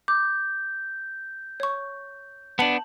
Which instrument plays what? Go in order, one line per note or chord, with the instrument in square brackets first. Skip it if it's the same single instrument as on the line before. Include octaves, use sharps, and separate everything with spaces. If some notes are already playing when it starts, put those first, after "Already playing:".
[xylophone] D6 [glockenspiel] G6
[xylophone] C#5 C#6
[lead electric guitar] B3 D4 [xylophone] A5 C#7 F#7